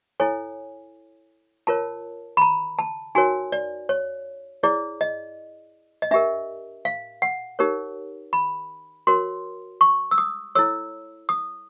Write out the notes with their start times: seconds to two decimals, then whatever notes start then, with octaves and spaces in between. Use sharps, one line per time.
0.20 E4 A4 C#5 G#5
1.67 F4 A#4 C#5 A5
2.37 B5
2.42 A#5
2.79 A5
3.15 D#4 F#4 A#4 C#5 G#5
3.52 D5
3.89 C#5
4.63 E4 G#4 C#5 D5
5.01 D#5
6.02 D#5
6.11 D4 G4 A#4 E5
6.85 F5
7.22 F#5
7.59 D#4 G4 A#4 C#5
8.33 B5
9.07 F#4 A#4 C#5 C6
9.81 C#6
10.11 E6
10.18 D#6
10.55 E4 A4 C#5 E6
11.29 D#6